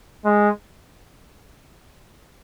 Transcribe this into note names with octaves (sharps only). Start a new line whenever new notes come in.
G#3